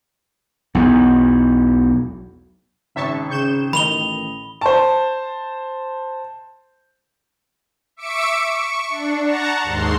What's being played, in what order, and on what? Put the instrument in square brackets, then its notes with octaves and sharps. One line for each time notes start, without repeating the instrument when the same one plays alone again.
[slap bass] B1 E2
[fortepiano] G#1 [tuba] C#3 [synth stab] E5 A5 C#6
[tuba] C#3 [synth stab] C#6 G6 E7
[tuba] A1 [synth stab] D#3 [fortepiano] D#5 G5 [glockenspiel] B5 F7 G7
[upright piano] C5 A5
[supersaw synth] E5 C#6 D6 E6 C#7 D7
C#6
D4
F#5 A5 A#5 C#6
D#2 G#2 C6